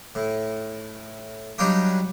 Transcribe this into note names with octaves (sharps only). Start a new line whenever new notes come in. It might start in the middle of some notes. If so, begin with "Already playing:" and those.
A2
F#3 G3 D4 D#4 F4 G4